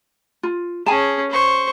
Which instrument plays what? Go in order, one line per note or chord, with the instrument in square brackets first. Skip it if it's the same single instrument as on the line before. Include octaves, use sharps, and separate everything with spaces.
[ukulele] F4
[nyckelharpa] C#4 G#4 [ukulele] G#5 A5
[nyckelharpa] C5 C#6